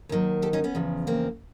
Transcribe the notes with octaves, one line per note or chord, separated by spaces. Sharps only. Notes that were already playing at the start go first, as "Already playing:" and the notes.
D#2 D#3 F#3
G4 A4
C#4 D#4
B3 C#4
E2 C#3 F3
A#3 C4